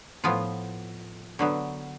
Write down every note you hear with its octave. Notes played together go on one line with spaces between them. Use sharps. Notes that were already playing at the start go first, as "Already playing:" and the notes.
A2 F3 B3 F4
D3 F#3 B3